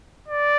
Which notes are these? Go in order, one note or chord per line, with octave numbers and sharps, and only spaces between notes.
D5